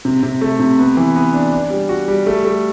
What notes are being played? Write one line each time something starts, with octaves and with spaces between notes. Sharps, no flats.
C3
C3
A3
C3
B3
E3
B3
D4
D4
G3
F#4
G3
A3
A3